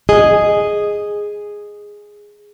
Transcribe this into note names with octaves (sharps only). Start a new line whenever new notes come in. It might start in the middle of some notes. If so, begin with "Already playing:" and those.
G#4 D#5